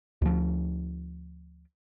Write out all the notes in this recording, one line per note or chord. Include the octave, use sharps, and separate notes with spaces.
D2 F3